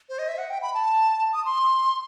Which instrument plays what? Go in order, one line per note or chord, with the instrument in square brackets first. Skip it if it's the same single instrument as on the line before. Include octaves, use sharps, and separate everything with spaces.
[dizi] C5
D#5
E5
F#5
G5
B5
A5
D#6
C6